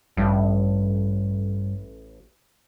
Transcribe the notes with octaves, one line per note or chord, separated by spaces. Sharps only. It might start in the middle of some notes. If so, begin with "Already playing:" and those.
A1 G2